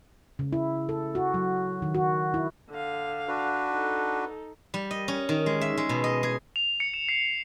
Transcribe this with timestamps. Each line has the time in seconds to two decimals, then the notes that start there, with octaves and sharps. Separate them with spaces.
0.39 C#3
0.53 E4
0.89 A4
1.15 F#4
1.34 F#3
1.82 D#3
1.95 F#4
2.34 E4
2.70 D3 F5
3.28 D4 F#4 B4
3.69 D#4 A4
4.74 G3
4.91 D#5
5.08 C#4
5.29 D#3
5.46 G#3
5.61 E5
5.77 G#3
5.89 B2
6.04 D#5
6.23 G#4
6.56 F7
6.80 C#7
6.94 E7
7.09 C7